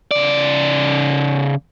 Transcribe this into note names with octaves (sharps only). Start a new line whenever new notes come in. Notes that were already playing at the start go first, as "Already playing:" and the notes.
C#3 D5